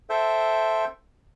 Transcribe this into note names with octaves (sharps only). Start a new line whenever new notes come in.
A4 C5 E5 G5